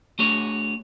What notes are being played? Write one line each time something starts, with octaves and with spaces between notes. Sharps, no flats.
A3 D4 F#4 G#4 C#5